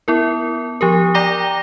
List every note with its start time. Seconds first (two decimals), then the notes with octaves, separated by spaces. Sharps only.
0.08 B3 E4 A#4
0.81 F3 G4 A#4
1.14 D5 G5 A#5 D6 A#6 G7